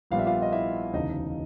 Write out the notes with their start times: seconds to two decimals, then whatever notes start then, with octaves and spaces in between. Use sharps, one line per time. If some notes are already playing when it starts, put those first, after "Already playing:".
0.11 A#1 A#2 G3 B3 F5
0.19 E5
0.27 F4 F5
0.42 D#5
0.52 E4 E5
0.93 E1 D2 C#3 E3 D#4 D#5